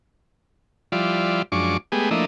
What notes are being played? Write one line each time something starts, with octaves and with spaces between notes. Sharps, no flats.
F3 G3 E4 F4 D5
F#2 F3 G#3 D4 C#6 D6
G#3 A3 B3 G4 G#4
F3 A3 A#3 D4 E4 D#5